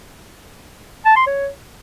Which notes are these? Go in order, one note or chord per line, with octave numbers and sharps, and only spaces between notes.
A5
C6
C#5